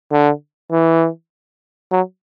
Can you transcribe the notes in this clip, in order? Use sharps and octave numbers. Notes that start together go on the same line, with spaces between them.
D3
E3
F#3